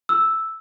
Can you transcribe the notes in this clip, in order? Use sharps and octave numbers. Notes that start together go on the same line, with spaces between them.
E6